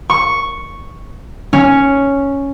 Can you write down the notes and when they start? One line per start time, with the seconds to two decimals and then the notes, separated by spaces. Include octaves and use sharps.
0.10 C#6
1.53 C#4